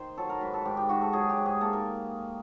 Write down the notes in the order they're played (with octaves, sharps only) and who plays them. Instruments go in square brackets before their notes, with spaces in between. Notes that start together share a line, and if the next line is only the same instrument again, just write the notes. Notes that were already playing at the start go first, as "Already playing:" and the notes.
Already playing: [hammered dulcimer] D#3 C5
F#3 A4
A#4
G#2 B4
A4
G#2 G4
G4
G#2 F#4
A4
F#3 G#4
G4
G#2
G#4
A#3 A4
A#4